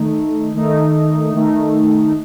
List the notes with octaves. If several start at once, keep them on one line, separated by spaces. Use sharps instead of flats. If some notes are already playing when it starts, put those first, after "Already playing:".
Already playing: D#3 A3 D#4
D#3 A3 D#4
D#3 A3 D#4